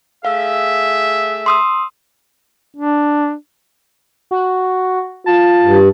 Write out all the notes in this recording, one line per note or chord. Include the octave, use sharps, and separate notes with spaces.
A3 G#4 E5 F5
C6 D#6 E6
D4
F#4
F4 A5
G2